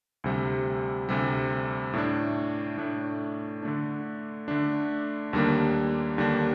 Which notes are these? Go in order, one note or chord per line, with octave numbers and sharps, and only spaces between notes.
D2 C3 G3
D2 C3 G3
A2 A3 D4
A2 A3 D4
D3 A3 D4
D3 A3 D4
D#2 D3 G3 A#3 D4
D#2 D3 G3 A#3 D4